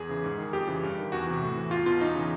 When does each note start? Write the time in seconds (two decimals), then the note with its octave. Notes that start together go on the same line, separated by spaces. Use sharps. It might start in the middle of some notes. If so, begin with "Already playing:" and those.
Already playing: E2 G#4
0.09 C#3 E3
0.24 G#2
0.38 D#3
0.53 F2 G4
0.67 C#3 E3
0.83 G2
0.98 D#3
1.12 E2 F#4
1.26 C3 E3
1.42 A2
1.56 E3
1.71 E2 F4
1.86 B2 F4
2.00 E2 D#4
2.15 C#3 E3